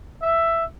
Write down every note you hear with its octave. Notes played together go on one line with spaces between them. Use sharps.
E5